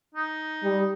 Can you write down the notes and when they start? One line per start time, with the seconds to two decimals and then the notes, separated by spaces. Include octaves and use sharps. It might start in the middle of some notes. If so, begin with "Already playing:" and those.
0.14 D#4
0.63 G3